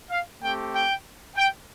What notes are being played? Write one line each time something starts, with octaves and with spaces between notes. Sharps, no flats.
F5
A3 C4 G4 G5
G5
G5